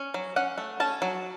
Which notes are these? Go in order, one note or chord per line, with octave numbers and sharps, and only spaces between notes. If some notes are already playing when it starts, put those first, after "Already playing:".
Already playing: C#4
F#3
C#4 F#5
A3
C#4 A5
F#3